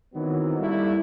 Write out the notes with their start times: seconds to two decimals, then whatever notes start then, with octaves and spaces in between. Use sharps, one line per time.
0.14 D#3 E3 F#3 B3 C4 D#4
0.59 G3 A3 A#3 D4 E4 A4